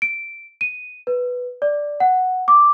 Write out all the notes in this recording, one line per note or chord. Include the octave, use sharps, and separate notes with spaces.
D7
D#7
B4
D5
F#5
D6